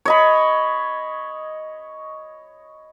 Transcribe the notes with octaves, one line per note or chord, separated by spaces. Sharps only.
C#5 D#5 B5